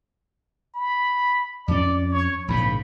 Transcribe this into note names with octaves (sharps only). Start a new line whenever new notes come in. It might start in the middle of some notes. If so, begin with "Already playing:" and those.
B5
F2 C#4 D5
C#5
A#1 G#2 C#3 B5